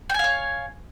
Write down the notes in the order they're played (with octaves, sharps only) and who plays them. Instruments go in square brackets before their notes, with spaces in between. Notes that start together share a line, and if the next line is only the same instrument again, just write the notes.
[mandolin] G5
G#5
F5
C#5